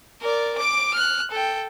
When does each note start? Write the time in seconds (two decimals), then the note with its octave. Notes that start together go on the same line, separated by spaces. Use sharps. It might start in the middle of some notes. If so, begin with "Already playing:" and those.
0.21 A#4 D5
0.58 D6 D7
0.94 F6 F#6
1.31 A4 G5